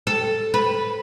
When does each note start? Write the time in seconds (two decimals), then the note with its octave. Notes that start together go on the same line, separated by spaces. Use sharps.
0.07 A4
0.54 B4